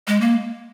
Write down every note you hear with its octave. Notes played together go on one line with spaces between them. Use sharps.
G#3
A#3